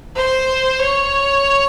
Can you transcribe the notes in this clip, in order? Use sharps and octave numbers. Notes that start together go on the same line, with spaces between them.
C5
C#5